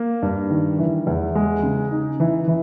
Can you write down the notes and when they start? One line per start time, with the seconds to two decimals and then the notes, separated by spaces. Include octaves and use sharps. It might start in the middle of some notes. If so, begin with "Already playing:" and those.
Already playing: A#3
0.22 G2
0.50 D#3
0.79 E3
1.07 E2
1.35 G#3
1.63 C#3
1.91 D#4
2.20 E3
2.48 E3